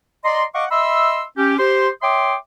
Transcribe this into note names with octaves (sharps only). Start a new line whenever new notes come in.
D5 D#5 A#5 C6
D#5 F5 F#5 C#6 D6
D#5 E5 B5 C6 E6
C#4 G4
G4 C5 C6
C#5 E5 G5 C6 D6 D#6